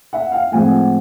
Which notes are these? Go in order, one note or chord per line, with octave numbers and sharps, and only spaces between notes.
E5 F#5
F5 G5
A2 F3 G#3 C4 F#5 G#5